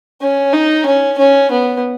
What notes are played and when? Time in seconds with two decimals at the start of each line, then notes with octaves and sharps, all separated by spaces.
0.21 C#4
0.53 D#4
0.86 C#4
1.18 C#4
1.51 B3